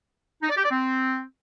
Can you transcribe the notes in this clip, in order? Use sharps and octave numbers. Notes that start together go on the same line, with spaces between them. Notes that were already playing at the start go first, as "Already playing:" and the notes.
D#4
D5
G4
D5
C4